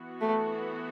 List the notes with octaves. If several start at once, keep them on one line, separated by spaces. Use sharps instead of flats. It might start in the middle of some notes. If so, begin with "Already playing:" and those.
Already playing: E3 B3 F#4
A3